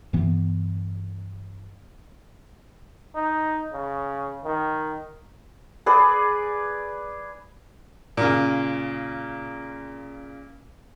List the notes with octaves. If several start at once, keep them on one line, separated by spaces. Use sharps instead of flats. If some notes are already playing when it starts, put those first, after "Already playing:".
G2 E3 B3
D#4
C#3
D#3
G#4 B4 D5
A#2 C#3